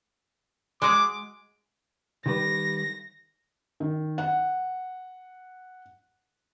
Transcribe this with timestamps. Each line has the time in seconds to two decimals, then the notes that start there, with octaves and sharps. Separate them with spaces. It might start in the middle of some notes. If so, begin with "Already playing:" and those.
0.82 G#3 F#4 G#4 D6
2.26 D#3 G3 B4 A#6
3.80 D#3
4.18 F#5